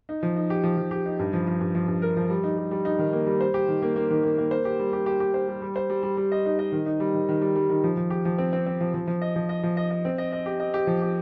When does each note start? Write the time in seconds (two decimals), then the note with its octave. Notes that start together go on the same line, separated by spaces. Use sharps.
0.09 D#4
0.23 F3
0.36 D#4
0.50 G4
0.64 F3
0.77 F3
0.91 G4
1.06 D#4
1.19 G2
1.33 F3
1.47 F3
1.60 G2
1.75 F3
1.88 G2
2.02 A#4
2.17 F3
2.30 G3
2.44 D#4
2.58 G3
2.71 G3
2.85 D#4
2.99 D#3
3.13 A#3
3.27 G3
3.41 C5
3.54 G4
3.68 D#3
3.82 A#3
3.96 A#3
4.10 D#3
4.24 A#3
4.38 A#3
4.51 C5
4.65 G4
4.79 G3
4.93 G4
5.06 G4
5.20 G4
5.34 C5
5.48 G3
5.62 G3
5.76 C5
5.90 G3
6.03 G3
6.17 G3
6.32 D#5
6.45 D#4
6.59 D#5
6.72 D#3
6.86 D#4
7.00 G3
7.14 D#3
7.29 D#3
7.42 G3
7.56 G3
7.69 D#3
7.84 F3
7.97 F3
8.10 G4
8.25 F3
8.38 C4
8.53 C4
8.66 C4
8.81 F3
8.94 F3
9.07 F3
9.22 D#5
9.36 F3
9.49 D#5
9.63 F3
9.77 D#5
9.91 D#5
10.05 C4
10.18 D#5
10.32 D#5
10.46 G4
10.60 D#5
10.74 G4
10.87 F3
11.01 G4